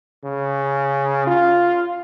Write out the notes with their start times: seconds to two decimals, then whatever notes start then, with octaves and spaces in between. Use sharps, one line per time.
0.24 C#3
1.27 F4